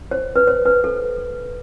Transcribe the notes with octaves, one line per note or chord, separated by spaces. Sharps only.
C5
B4
C5
B4
A4